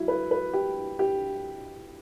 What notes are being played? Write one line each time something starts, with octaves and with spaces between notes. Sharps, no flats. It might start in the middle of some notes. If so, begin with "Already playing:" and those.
Already playing: F#3 E4
B4
B4
G4
G4